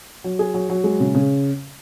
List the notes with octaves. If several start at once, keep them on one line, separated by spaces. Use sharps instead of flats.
F#3
G#4
F#3
F#3
G#3
C#3
C#3